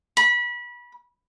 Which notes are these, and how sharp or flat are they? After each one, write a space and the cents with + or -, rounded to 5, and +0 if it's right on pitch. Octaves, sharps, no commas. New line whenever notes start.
B5 -25